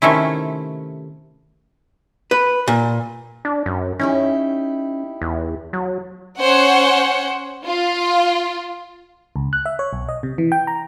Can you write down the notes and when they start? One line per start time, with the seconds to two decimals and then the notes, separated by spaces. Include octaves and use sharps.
0.02 C3 D#3 A3 C#4 E4
2.31 B4
2.68 A#2
3.45 D4
3.66 F#2
3.99 C#4 D#4 E4 G4
5.22 E2
5.73 F#3
6.39 C#4 C5 C#5 F#5
7.67 F4
9.36 C#2
9.53 F#6
9.66 E5
9.79 C#5
9.93 B1
10.09 D#5
10.23 C3
10.38 E3
10.52 G5
10.67 A#5